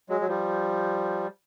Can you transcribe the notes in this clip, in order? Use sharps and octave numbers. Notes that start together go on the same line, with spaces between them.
F#3 G#3
F#3
F3 G3